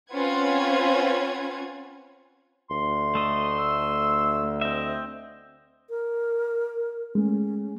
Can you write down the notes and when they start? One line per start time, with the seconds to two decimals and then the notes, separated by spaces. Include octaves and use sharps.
0.12 C4 C#4 F4 B4 F#5 G#6
2.70 D2 C6
3.15 A3 D#5
3.59 E6
4.61 C4 D#5 E5
5.90 A#4
7.15 G#3 A3 C#4